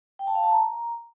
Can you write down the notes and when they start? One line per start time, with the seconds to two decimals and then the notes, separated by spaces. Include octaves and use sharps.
0.19 G5
0.27 A5
0.35 F5
0.43 A5
0.51 A#5